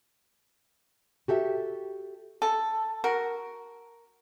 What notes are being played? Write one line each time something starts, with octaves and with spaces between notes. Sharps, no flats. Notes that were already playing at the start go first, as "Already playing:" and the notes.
F#4 G4 A4 E5
A4
F#4 A#4